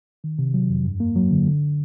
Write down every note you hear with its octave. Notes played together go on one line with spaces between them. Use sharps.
D#3
C3
F#3
F2
G2
A#3
F#3
D3
D3